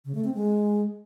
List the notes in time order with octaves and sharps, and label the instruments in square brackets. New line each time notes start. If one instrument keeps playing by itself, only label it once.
[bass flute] C#3
A3
C4
G#3